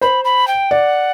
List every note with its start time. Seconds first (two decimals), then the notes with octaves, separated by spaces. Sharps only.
0.01 C5 B5
0.25 B5
0.48 G5
0.71 D5 F#5